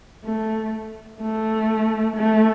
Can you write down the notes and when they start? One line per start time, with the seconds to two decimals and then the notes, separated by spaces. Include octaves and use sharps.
0.24 A3
1.20 A3
2.16 A3